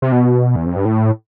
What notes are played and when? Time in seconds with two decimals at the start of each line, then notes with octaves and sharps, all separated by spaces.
0.02 C3
0.12 B2
0.56 E2
0.66 F2
0.76 G2
0.85 A2